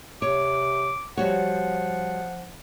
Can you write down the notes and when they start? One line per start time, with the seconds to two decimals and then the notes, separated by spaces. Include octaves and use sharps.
0.22 C3 C#5 D6
1.17 F3 G3 F#4 C#5 F#5